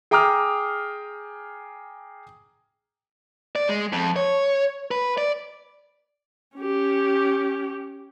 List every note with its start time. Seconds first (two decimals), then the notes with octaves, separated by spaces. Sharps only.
0.11 G#4 G5 A#5 D6 D#6 F6
3.56 D5
3.69 G#3
3.92 F2
4.16 C#5
4.91 B4
5.18 D5
6.57 C#4 G4